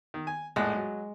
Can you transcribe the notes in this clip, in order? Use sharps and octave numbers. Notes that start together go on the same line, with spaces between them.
D#3
G#5
A#1 A2 G#3 F#6
F#3